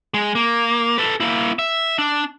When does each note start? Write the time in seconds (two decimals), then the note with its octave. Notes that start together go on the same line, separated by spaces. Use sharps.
0.14 G#3
0.35 A#3
0.98 A4 B4
1.20 A#3 E4
1.59 E5
1.98 D4